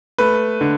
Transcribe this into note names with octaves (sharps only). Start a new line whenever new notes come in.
A3 B4
D3